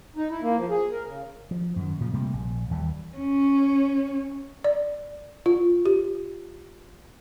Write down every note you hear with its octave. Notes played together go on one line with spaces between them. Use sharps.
D#4
E4
A#3
F3
G#4
A#4
C#3
F3
F#2 D#3
A#2 C#3 F3
C3 G3 A3 A#3
A#1
D#2 E3 G3
C#4
D5
F4
G4